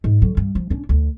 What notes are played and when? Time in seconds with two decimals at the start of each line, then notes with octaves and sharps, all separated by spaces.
0.04 G#2
0.22 D3 F#3
0.37 G2
0.55 F3
0.70 C#4 D4
0.89 D2